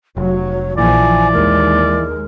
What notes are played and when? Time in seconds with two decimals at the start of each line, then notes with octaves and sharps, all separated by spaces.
0.17 F1 F#3 C#5
0.78 A#1 E3 F3 D5 G#5
1.33 D#2 G#3 A#4